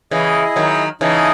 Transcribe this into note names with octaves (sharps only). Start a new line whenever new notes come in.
C#3 E3 E4 G#4 D#5
D#3 F#3
C#3 E3 D#4 G#4 D#5 A5